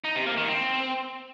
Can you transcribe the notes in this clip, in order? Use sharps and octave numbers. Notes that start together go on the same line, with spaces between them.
D#4
C3
A#3
D#3
C4